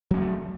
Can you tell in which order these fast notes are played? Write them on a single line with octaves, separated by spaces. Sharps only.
F#3 C#4 A#3 A3